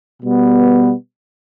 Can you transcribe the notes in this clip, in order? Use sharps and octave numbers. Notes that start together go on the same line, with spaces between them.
B2 G3 B3